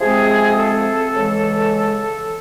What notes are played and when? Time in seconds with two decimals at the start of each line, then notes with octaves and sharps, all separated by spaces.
0.01 C3 F3 G#3 C4 G#4
0.57 A4
1.14 C#3 E3 G#3